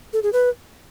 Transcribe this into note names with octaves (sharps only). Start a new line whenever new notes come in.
A4
G#4
B4